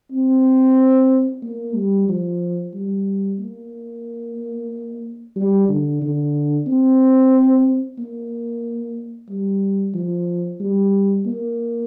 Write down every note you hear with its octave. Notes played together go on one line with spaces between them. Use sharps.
C4
A#3
G3
F3
G3
A#3
G3
D3
D3
C4
A#3
G3
F3
G3
A#3